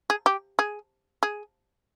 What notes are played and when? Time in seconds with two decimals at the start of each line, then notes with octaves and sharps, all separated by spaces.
0.10 G#4
0.26 G4
0.59 G#4
1.23 G#4